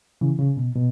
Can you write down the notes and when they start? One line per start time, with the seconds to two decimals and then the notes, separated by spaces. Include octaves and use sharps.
0.21 C#3 E3
0.39 C#3
0.57 B2
0.75 B2